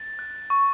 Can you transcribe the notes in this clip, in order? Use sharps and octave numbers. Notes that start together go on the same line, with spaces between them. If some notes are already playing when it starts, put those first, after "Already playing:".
Already playing: A6
F#6
C#6